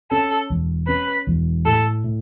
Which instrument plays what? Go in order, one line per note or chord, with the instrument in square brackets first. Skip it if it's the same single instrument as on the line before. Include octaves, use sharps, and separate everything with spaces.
[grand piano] C#4 [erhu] A4
[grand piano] E1
[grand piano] C#4 [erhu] B4
[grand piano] E1
[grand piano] A2 [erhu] A4
[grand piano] A2